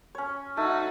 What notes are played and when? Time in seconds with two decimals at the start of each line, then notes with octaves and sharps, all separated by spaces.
0.15 C#4 C#5
0.57 A3 D#4 F#4